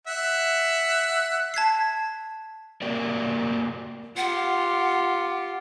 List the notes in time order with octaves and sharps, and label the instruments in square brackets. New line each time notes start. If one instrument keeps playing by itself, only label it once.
[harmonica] E5 F#5
[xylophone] A5 G#6 B6 C7
[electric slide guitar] A#3 F#4 G4 A#4 D5
[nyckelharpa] F4 G4 [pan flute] F#5